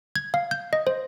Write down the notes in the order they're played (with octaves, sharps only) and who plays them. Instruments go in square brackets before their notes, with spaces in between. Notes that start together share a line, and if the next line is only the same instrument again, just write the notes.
[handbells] G#6
F5
G6
D#5
C5